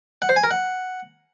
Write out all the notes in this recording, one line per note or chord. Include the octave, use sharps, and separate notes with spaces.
F#5
C5
G#5
A#4
F#5